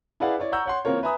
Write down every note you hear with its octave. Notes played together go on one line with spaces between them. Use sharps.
E4 G#4 B4 D5 F5 F#5
E4 C#5 D5
F#5 A#5 C#6 E6 G6
C#5 F#5 C6
E3 A#3 C4 F4 A#4 C#5
B4 E5 G#5 A#5 B5 D#6